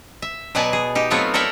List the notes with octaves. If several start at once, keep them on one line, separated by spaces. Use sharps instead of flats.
E5
B2 F#3 B3 D5 G#5 A5
G#4
D#4 G4
F#3 A3 B3 C4 F4 C#5
A4 A#4 C#5 D5 E5 G5